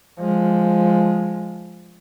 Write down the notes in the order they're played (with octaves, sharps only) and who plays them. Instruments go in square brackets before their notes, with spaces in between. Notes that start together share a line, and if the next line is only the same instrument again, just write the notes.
[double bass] F3 G#3